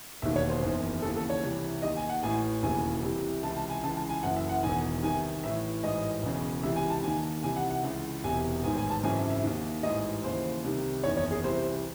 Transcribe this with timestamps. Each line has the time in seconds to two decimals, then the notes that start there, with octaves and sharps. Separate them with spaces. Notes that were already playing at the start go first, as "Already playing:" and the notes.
0.22 E1 D#2 D#3 E5
0.36 C#5
0.50 C5
0.62 F#1 E2 D#3
1.02 D#2 C#3 E3 A4
1.16 A4
1.30 C#5
1.43 C2 C3 E3
1.82 D#2 D#3 D#5
1.96 G#5
2.09 F#5
2.23 A1 A2 E3 G#5
2.63 E1 D#2 C#3 E3 G#5
3.03 C2 C3 E3
3.43 C#2 C3 E3 A5
3.56 A5
3.70 G#5
3.83 C#2 C#3 E3 A5
3.96 A5
4.10 G#5
4.23 F#1 F#2 E3 F#5
4.36 E5
4.49 F#5
4.63 E1 E2 D#3 G#5
5.03 C2 C3 D#3 G#5
5.43 A1 A2 E3 E5
5.83 A1 G#2 E3 D#5
6.23 E1 E2 C#3 E3
6.63 C#2 C3 E3 E5
6.76 G#5
6.90 A5
7.03 D#2 D#3 G#5
7.43 C2 C3 E3 G#5
7.56 F#5
7.70 F#5
7.83 C#2 C#3 E3
8.24 E1 E2 C3 G#5
8.63 A1 G#2 D#3 G#5
8.77 G#5
8.90 A5
9.03 G#1 F#2 C#3 E3 G#5
9.17 E5
9.30 E5
9.43 D#2 D#3
9.83 A1 G#2 E3 D#5
10.24 D#2 C#3 E3 C5
10.64 C2 C3 D#3
11.04 F#1 E2 D#3 C#5
11.17 C#5
11.31 G#4
11.44 C2 C3 E3 C5